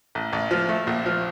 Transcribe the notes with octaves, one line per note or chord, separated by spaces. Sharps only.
A1
A1
F3
A3
A#1
F3